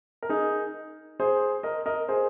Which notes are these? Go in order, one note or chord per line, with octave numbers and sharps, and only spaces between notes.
A#4
D#4 G#4
G#4 C5
A#4 D#5
A#4 D#5
G#4 C5